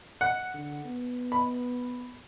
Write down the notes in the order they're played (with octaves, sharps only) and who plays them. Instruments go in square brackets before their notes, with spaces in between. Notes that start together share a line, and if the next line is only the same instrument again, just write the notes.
[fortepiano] F#5
[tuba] D3
B3
[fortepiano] B5